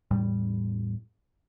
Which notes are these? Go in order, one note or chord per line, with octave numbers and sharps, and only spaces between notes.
E2 A2 G3